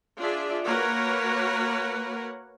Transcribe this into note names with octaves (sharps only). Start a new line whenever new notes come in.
D4 F4 G#4 D5 E5
A#3 F#4 A#4 B4 C#5 F#5